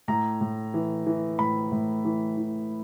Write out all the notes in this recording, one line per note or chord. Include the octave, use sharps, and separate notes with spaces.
A2 A#5
A2
E3
E3
A2 B5
A2
E3
E3